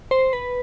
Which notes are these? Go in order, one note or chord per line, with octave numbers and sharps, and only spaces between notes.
C5
B4